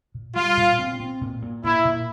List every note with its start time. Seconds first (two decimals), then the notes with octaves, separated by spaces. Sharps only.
0.15 A#2
0.36 G3 F4
0.57 A#2
0.79 C4
1.00 C4
1.21 A#2
1.42 A#2
1.64 A#2 E4
1.85 A#2